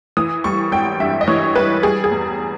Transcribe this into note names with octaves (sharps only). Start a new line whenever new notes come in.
E3 D#6
G3 C#6
G#1 G5
G2 E5
D#5
E3 C#5
G3 B4
G3 G#4
G#4
E2